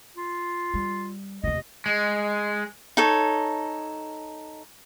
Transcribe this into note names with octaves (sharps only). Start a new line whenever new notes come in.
F4
G3
F1 D#2 D#5
G#3
D#4 A4 C#5